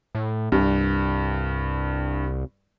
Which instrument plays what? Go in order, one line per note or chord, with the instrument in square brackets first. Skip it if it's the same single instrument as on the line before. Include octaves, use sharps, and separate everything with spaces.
[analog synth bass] A2
[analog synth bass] C2 [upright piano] G2